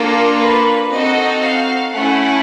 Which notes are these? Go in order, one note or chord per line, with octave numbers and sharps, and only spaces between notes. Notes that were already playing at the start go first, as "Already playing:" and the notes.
Already playing: A#3 D4 F4 A4 A#4
B4
C4 D#4 F#4 A4 D#5
F5
A3 C#4 E4 F#5